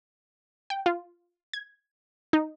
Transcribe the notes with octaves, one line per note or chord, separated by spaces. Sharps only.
G5
F4
G#6
D#4